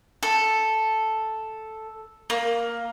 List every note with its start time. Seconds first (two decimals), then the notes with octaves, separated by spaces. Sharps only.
0.23 A4
2.30 A#3